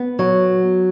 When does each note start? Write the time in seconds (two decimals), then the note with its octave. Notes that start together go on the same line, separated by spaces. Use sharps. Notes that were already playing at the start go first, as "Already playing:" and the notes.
Already playing: B3
0.19 F#3